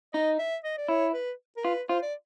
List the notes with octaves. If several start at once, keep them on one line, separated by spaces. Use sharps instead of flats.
D#4 D#5
E5
D#5
D5
E4 C#5
B4
A#4
F4 B4
F4 C5
D5